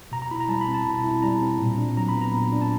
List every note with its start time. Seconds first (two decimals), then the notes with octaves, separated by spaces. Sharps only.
0.12 B2 A#5
0.22 A#5
0.31 E4 B5
0.40 A#5
0.49 G3 A5
0.61 B5
0.68 C4
0.74 A5
0.86 B2
1.04 E4
1.22 G3 A#5
1.41 C4
1.59 A#2
1.78 D4
1.97 F#3 A#5
2.08 B5
2.15 B3
2.21 A#5
2.33 A#2
2.52 D4
2.61 A5